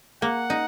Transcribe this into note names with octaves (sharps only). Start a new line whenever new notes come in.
A#3 F#5
D#4